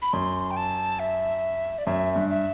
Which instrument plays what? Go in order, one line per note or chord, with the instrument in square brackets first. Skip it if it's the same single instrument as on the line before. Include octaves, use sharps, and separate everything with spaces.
[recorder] B5
[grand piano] F#2 [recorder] C6
[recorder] G5
A5
E5
D5
[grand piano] F#2 [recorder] E5
[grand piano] G2
[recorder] E5